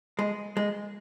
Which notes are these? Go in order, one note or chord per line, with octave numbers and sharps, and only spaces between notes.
G#3
G#3